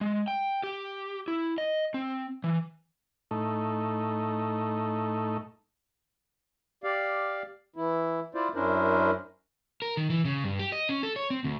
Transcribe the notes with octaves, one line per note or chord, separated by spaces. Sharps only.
G#3
G5
G4
E4
D#5
C4
E3
A2 A3 D#4
G4 D5 F5
E3 E4
E4 F4 C5 D5
F#2 C#4 D4 E4 A#4 C5
A#4
D#3
E3
C#3
G2
G4
D#5
C#4
A4
C#5
C4
D2